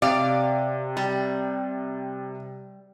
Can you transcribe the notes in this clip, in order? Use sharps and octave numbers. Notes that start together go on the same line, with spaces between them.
C3 D5 F5
G3